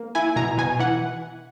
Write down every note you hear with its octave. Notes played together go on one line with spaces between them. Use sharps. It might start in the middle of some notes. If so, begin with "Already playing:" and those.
Already playing: A#3
E4 G#5
B2 A#5
B2 G#5
E3 F#5